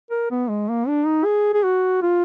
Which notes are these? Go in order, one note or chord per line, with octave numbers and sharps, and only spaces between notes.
A#4
B3
G#3
A#3
D4
D#4
G#4
G#4
F#4
F4